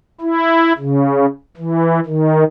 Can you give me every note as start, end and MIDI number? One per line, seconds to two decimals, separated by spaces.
0.21 0.73 64
0.78 1.26 49
1.57 2.00 52
2.06 2.44 51